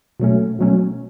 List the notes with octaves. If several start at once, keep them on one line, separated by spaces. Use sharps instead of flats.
B2 F#3 A3 C#4
B2 F#3 A3 C#4